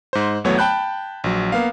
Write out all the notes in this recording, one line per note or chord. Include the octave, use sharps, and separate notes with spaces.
G#2 C5
G#1 E2 F#3 A3 B3 C#5
G5 A5 B5 F#6 G6
A#1 F#3
A#3 B3 F5